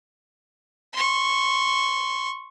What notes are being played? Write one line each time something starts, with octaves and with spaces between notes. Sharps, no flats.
C6 C#6